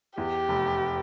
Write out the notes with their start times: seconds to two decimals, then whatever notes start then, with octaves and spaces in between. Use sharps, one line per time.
0.18 E2 G4
0.49 F1